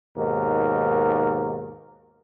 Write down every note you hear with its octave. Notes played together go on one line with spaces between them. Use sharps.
D#2 G#2 B2 A#4